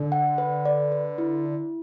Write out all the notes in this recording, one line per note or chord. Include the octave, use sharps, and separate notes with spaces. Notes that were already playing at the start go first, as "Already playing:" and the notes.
Already playing: D3 D4
F#5
B4
D5
B4
E4
E4